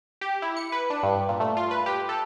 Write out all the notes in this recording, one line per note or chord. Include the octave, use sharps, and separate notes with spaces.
G4
E4
C#7
B4
D4
G2
A#2
A3
F4
B4
G4
A4